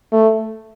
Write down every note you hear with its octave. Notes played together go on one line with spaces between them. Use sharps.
A3